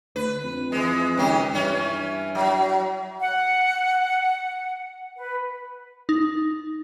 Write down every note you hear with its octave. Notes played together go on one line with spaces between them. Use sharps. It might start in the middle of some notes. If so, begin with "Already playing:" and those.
D2 B4
F2
E3 G#3
C#2 D#3 C#4 G4
G2 E3 C#4
F#3
F#5
B4
D#4